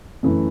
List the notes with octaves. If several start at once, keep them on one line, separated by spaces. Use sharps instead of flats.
F#2 E3 A3